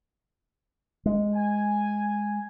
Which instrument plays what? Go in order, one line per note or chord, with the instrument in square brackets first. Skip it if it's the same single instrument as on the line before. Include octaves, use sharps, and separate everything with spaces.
[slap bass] G#3
[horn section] G#5